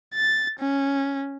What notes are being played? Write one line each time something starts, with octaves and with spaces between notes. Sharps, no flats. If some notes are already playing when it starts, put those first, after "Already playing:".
A6
C#4